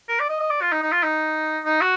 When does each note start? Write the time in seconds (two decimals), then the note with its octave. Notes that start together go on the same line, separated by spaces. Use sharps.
0.09 A#4
0.20 D5
0.30 D#5
0.40 D#5
0.51 D5
0.62 F4
0.72 D#4
0.82 D#4
0.92 F4
1.03 D#4
1.65 D#4
1.81 F#4